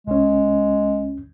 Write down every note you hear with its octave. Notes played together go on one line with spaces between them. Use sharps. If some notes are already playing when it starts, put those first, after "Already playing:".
C2 G#3 C#4